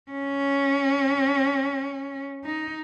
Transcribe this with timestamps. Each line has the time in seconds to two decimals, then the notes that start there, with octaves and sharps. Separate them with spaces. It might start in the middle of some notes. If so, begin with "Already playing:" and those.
0.11 C#4
2.44 D#4